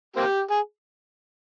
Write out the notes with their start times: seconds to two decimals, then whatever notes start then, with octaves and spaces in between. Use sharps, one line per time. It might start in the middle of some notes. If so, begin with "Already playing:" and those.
0.16 A#3 C4 G4
0.50 G#4